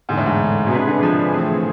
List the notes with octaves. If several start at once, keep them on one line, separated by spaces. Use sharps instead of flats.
E2 G#2 D3 G#3
A2
G#2
B2
C3 G#3 D4 G#4 B4
D3
F3
E3 A3 C4 G#4